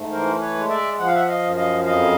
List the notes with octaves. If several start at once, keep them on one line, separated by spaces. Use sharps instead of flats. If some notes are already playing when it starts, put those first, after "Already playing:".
Already playing: G#2 A3
E3 A#4 C5
B4 C#5
G#3
D5 E5
F3 F#5
F5
E5 F#5
D#5 F5
F#2
D#5 F5
F2 D#5 F5